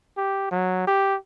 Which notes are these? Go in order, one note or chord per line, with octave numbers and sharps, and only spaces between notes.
G4
F#3
G4